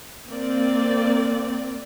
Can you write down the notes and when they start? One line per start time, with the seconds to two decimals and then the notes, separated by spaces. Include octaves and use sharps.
0.28 A#3 C4 D5